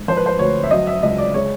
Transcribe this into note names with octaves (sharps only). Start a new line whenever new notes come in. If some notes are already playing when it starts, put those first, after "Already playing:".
Already playing: G#2
F3 C5
B4
C5
D2 C#5
E5
F#3 D#5
E5
C#2 D#5
D5
G#3 C#5